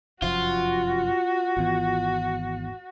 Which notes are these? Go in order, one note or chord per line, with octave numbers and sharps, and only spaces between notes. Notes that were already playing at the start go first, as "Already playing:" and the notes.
F1 F#2 F3 F4 F#4
G#1 E2